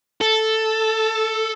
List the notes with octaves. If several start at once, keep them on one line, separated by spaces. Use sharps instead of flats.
A4